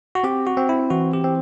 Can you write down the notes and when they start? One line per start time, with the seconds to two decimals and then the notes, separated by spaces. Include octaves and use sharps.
0.15 F#4
0.23 C4 G4
0.47 F#4
0.57 C4
0.69 E4
0.90 E3 F#4
1.14 G4
1.24 C4